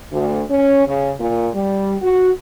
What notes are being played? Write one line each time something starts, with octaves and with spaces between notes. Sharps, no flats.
D2
C#4
C#3
A#2
G3
F#4